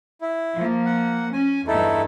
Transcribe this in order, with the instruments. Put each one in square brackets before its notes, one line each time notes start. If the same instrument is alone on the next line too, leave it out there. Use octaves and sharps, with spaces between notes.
[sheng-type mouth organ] E4
[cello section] F3 A#3
[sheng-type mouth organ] F#5
[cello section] C#4 [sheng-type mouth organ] G#5
[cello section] E2 G2 [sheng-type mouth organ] D#4 E4 A4